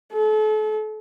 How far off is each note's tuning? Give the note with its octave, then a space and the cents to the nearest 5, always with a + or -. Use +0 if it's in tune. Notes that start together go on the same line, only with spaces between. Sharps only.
A4 -35